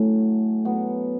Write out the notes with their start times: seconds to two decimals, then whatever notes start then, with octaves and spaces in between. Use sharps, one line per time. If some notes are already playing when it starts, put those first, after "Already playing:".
Already playing: A2 F#3 A3 C#4
0.65 F#3 B3 F#4